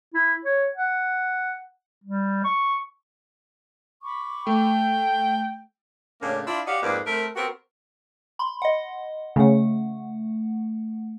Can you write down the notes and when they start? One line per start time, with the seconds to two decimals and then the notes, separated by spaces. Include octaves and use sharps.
0.14 E4
0.44 C#5
0.75 F#5
2.04 G3
2.44 C#6
4.02 B5 C#6 D6
4.47 A3 G5
4.74 G6
6.22 A2 C#3 A#3 C#4 D4
6.47 D4 E4 F4
6.67 F#4 G4 D5 D#5 F5
6.83 F2 G#2 A#3 B4 D5
7.07 A3 C4 A#4
7.36 B3 C4 F#4 G4 A#4
8.39 B5 C6
8.62 D#5 F#5
9.36 C#3 A3 F#5